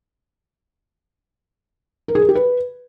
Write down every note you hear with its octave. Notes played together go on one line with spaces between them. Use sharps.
A#4
G#4
A#4
G4
B4